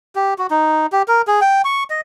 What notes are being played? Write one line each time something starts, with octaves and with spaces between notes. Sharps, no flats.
G4
F#4
D#4
G4
A#4
G#4
G5
C#6
D#5